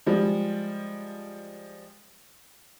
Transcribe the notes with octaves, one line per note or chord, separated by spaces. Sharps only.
F3 G3 G#3